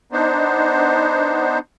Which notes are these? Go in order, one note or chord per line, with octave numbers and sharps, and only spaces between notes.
B3 D4 D#4 C5